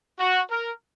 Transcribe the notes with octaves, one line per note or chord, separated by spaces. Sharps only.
F#4
A#4